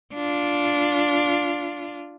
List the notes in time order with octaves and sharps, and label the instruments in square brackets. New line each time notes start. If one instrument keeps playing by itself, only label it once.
[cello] D4 F4